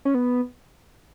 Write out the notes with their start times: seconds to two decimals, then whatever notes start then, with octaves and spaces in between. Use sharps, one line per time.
0.05 C#4
0.14 B3